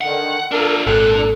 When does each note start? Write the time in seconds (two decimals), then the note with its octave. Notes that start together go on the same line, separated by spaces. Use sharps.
0.01 D3 D#3 F#5
0.51 D4 F4 A4 A#4
0.87 G#1 A#2 A4 F#6
1.09 D4